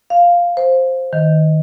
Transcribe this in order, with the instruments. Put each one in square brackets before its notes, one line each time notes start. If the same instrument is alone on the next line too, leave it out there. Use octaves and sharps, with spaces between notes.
[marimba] F5
C5
D#3